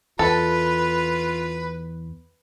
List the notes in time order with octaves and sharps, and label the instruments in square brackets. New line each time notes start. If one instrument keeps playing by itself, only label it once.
[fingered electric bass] E2 [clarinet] F4 [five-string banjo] A4 [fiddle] B4